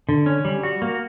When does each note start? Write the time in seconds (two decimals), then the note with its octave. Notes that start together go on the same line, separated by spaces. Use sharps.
0.09 D3
0.26 C#4
0.45 G3
0.63 F#4
0.82 A#3